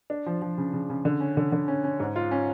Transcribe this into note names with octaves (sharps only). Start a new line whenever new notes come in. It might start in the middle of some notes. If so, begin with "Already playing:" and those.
D4
F3
F3
C#3
C#3
C#3
D3
C#4
D3
D3
C#4
C#4
G#2
F4
C#4